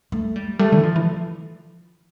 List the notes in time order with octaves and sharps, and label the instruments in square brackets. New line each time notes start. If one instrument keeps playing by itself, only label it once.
[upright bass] A3
G3
[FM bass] G3 [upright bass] A3
[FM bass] D3
E3
[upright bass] F3
[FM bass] E3